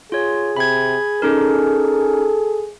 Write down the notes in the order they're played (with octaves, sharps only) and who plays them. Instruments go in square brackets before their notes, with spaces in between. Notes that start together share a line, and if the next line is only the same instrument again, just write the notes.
[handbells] F4 C#5 [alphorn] G#4
[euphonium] C3 [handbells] B5 G#6
[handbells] C#4 D#4 A#4 [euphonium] A4